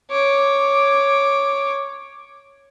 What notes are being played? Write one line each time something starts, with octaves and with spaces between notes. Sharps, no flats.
C#5 D6